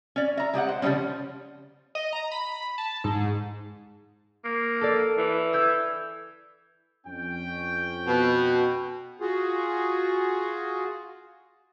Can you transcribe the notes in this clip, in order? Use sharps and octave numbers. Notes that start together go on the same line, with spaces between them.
C#4 D5
E5 A#5
G#3 G4 D#5 F#5
C5
C#3 F3 G3 G#3 C#4
D#5
A#5
B5
A5
G#2
A#3
A4 D5
E3
E6 G6 G#6
F2 C#4 G5
B2
F4 F#4 G#4